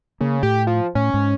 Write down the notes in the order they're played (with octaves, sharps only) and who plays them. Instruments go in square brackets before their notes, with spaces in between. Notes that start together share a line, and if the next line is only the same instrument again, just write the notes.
[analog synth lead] C#3 [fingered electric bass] A#3
[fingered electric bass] A2 [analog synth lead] G4
[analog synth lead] F3
[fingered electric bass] A2 [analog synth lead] C#4
[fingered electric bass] G#2